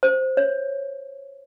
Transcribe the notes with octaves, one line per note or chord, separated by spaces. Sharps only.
C5
C#5